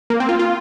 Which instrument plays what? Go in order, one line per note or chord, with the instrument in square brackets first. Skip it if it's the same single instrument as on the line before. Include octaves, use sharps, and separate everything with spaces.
[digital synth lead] A#3
C4
F4
F4